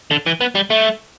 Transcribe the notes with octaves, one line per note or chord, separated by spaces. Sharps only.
D3
E3
B3
G3
A3